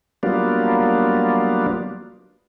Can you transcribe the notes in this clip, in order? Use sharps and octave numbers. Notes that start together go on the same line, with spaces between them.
F#3 G3 A#3 B3 D4 F4